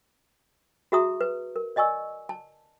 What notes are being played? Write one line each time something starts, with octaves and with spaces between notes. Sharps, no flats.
F#4 G#4 E5 A#5 C#6 D#6
B4
A#4
D5 D#5 G#5 C#6 E6
A5